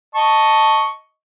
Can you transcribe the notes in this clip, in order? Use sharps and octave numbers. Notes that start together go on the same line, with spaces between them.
D#5 A5 C#6